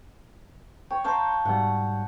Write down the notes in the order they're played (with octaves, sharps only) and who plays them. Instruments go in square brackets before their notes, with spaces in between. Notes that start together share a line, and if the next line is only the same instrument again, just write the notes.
[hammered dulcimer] C#5 [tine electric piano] G5
[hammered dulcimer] F5 G5 A5 [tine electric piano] A#5 C6 C#6
[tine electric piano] G#2 B2 G3 [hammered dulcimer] F#5